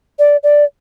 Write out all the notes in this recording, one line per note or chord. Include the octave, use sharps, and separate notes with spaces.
D5
D5